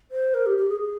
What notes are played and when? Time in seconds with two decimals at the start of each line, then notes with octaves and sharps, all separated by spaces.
0.11 C5
0.34 A#4
0.46 G4
0.58 G4
0.69 G#4
0.81 G#4